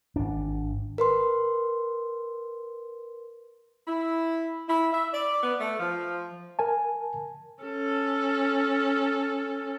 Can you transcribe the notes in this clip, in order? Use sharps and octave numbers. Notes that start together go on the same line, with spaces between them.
G#1 D4
A#4 B4 C6
E4
E4
E5
D5
B3
A3
F3
A#4 G#5 A5
C#4 A4